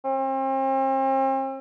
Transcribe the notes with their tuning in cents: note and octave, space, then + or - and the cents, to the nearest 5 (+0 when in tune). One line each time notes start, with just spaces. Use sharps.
C4 +40